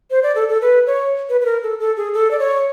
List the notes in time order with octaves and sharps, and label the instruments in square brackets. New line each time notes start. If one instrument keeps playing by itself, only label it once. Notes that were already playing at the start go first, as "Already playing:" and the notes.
[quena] C5
D5
A4
A4
B4
C#5
B4
B4
A#4
A4
A4
G#4
A4
D5
C#5